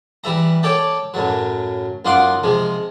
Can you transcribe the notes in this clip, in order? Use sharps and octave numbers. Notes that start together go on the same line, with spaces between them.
E3 G3 E5 A#5
A4 C#5 D5 G5 A5
F#2 A2 F#3
F#2 D#4 F4 F#5 C6 D6
C3 F3 G#3